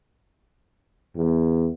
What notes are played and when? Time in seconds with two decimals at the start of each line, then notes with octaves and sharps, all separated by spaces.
1.16 E2